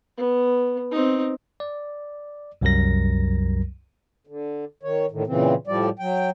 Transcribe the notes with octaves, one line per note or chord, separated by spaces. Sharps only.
B3
C4 D#4
D5
C2 F#2 F#3 G3 A#4 A#6
D3
D#3 C#5
A2 D3 D#3
A#2 C#3 E3 C4
A2 F3 G3 D5
F#3 G5